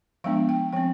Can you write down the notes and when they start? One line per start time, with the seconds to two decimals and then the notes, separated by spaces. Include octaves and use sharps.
0.24 F3 G#3 B3 D4 F5
0.49 G5
0.73 F3 C4 G5